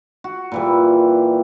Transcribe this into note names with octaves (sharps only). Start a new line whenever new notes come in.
F#4
A#2 E3 G3